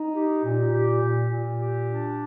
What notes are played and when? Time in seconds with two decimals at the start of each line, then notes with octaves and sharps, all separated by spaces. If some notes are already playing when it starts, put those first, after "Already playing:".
Already playing: D#4
0.15 G4
0.45 A#2
0.73 G4
1.02 A#2
1.31 A#2
1.60 G4
1.89 D4